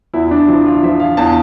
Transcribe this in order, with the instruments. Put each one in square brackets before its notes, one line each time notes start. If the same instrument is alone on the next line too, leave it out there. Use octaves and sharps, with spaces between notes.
[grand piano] E2 E4
E4
D4
F3 E4
F4
F3 E5
F5
E2 A5